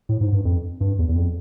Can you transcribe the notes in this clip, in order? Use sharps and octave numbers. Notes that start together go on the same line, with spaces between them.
A2
G#2
G2
F2
G2
E2
E2
F2